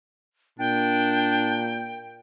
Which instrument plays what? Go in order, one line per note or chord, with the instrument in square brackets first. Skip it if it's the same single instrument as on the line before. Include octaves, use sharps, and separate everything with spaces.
[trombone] A#2 [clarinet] D4 [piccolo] G5